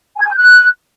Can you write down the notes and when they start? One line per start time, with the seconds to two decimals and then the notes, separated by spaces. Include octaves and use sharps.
0.16 G#5
0.21 G#6
0.27 G#5
0.32 G6
0.37 F#6